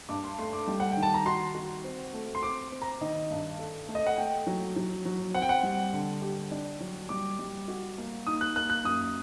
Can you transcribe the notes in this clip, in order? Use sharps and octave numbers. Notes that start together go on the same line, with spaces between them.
G2 D6
C6
A3 C6
D6
G3
F#5
G5
D#3
A5
A#5
F#4 C6
F#4
C4
A3
C6
C4 D6
C4
A#5
D#3 D#5
G2
A4
A3
D#5
F#5
A3 G5
F#3
F#3
F#3
C4 F#5
G5
F#5
G3
D3
G4
D4
F#3
G3 D6
G3
F#4
A#3
D#4 D#6
F#6
A#3 F#6
F#6
F#2 D#6